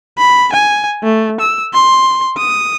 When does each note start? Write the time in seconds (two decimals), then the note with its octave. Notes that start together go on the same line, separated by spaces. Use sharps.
0.18 B5
0.52 G#5
1.03 A3
1.40 E6
1.73 C6
2.37 D#6